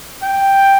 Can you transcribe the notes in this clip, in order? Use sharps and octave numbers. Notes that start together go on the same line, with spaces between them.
G5